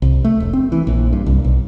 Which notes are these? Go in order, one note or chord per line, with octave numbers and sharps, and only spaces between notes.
C2
A3
E1
C4
E3
A#1
G2
C2
B1